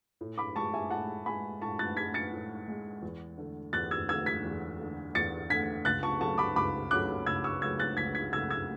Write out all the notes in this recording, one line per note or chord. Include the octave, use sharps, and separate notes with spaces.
A2
B5 D6
G#3 A5 C#6
E5 G#5
A2 F#5 A5
G#3 G#5 B5
A2 A5 C#6
F#6 A6
G#3 G#6 B6
A6 C#7
A2
G#3
E2
D3 A3
E2 F#6 A6
E6 G#6
D3 A3 E6 G#6
G#6 B6
E2
D3 A3
E2 A6 C#7
D3 A3 G#6 B6
C#2 F#6 A6
A5 C#6
C#3 F#3 A3 A5 C#6
B5 D6
C#2 B5 D6
C#3 F#3 A3 D6 F#6
C#2 E6 G#6
C#6 E6
C#3 F#3 A3 E6 G#6
F#6 A6
C#2 G#6 B6
G#6 B6
C#3 F#3 A3 E6 G#6
E6 G#6